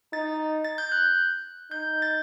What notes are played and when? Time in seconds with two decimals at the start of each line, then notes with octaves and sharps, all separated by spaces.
0.13 D#4 A6
0.65 A6
0.78 G6
0.92 F#6
1.71 D#4 G6
2.02 A6